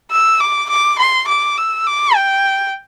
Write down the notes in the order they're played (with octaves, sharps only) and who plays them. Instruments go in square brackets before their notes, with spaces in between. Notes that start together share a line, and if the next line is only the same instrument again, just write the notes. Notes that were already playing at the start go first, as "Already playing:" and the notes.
[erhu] E6
D6
D6
C6
D6
E6
D6
G5